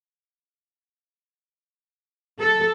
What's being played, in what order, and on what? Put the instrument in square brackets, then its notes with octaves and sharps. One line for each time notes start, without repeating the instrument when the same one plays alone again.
[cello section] A4